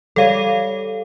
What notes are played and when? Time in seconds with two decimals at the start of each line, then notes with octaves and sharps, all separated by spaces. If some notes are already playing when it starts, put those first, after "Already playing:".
0.16 G3 A4 C#5 F5 D#7